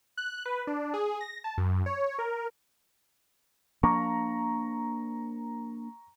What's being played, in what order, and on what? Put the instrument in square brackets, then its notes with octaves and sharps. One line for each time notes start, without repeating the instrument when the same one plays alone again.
[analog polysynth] F#6
B4
D4
G#4
A#6
A5
F#2
C#5
A#4
[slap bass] F3 A#3 D4 [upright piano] A#5 C#6